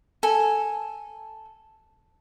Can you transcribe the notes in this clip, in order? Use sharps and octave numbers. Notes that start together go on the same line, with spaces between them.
A4 G#5